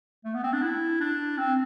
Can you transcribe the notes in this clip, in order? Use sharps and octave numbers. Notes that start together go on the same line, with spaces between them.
A3
B3
C4
D4
E4
D4
C4